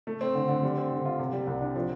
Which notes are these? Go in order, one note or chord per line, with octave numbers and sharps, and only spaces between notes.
A3
C4
D3
D3
G3
C4
D3
F4
C3
G3
C2
D4
F3